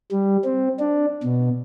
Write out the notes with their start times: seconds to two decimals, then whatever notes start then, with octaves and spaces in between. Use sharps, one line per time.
0.11 G3
0.44 C4
0.79 D4
1.23 B2